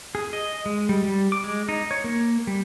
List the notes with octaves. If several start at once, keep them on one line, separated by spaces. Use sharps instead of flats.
G#4
D#5
G#3
G3
G3
D6
G#3
D#4
C#5
A#3
G3